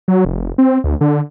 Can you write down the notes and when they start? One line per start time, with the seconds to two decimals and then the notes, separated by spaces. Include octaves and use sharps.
0.08 F#3
0.25 F1
0.58 C4
0.84 D2
1.01 D3